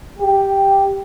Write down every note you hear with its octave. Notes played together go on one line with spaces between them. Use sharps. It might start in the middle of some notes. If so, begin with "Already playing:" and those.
G4